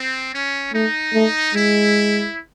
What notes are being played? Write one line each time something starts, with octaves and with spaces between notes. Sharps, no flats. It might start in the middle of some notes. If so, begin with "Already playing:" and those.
Already playing: C4
C#4
A3 D#4
A3
G#3 E4